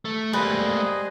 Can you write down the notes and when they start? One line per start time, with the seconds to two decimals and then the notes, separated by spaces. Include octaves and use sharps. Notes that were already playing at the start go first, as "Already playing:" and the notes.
0.05 A3
0.33 G3 A3 A#3 G#4 B4 C5 D#5